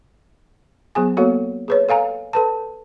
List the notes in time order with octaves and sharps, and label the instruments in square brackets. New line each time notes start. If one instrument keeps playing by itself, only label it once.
[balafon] F#3 B3 G#4 G#5
A#3 B3 F#4 A4 C#5
G#4 B4 C#5
A4 F5 G#5 A#5
A4 B4 A5